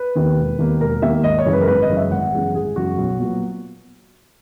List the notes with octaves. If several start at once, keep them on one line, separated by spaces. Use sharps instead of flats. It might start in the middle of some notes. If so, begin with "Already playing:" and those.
Already playing: B4
D#2 D#3 A#3
E1
D#2 D#3 A#3
E1 A#4
D#2 D#3 A#3 E5
G#1 D#5
C#5
F#2 C#3 E3 G#3
B4
A#4
G#1 B4
D#5
F#2 C#3 E3 G#3
E5
G#1 F#5
F#2 C#3 E3 G#3
G#1 G#4
F#2 C#3 E3 G#3 F#4
B1
A#2 F#3 B3